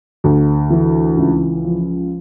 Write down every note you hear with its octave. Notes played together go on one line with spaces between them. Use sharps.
D2
E3
C#2
F3